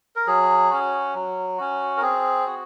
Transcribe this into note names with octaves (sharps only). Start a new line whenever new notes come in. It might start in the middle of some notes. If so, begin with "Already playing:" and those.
A#4
F#3 G#4
C#4 F#4
F#3
C#4 F#4
A#4
C4 G#4
F#4